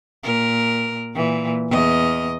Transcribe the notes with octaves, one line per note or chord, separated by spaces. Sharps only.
A#2 A#4
A#2 E3
E2 D#5